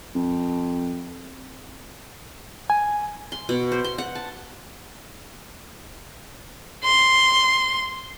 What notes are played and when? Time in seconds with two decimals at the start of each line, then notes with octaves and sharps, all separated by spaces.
0.15 F2
2.70 G#5
3.32 C6
3.49 B2
3.72 C5
3.84 C6
3.98 F#5
4.15 A5
6.84 C6